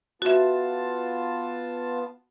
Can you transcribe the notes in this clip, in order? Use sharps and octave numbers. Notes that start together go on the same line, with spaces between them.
B3 F4 F#4 E5 A5